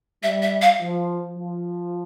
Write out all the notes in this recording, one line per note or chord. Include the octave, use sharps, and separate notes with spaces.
G3 E5
E5
F5
F3
F3